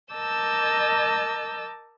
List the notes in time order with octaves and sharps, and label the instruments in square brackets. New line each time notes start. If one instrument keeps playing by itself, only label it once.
[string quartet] A#4 D#5 A5 D6 E6 G6